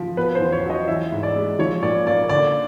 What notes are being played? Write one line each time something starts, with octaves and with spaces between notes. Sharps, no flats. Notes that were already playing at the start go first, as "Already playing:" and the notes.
Already playing: F3
B2 B4
C5
E2
C#5
F#3
D#5
E3 E5
G#2
D5
G#3
F3 C#5
A#2 D5
A#3 D5
D3 D5